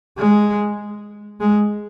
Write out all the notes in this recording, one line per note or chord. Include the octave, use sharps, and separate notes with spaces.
G#3
G#3